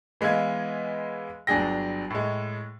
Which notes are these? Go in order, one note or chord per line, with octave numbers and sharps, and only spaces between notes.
E3 G#3 B3 F5 G#6
G1 F#3 D4 G#4 G5 A#6
A2 G#3